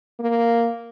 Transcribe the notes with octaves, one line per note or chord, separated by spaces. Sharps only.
A#3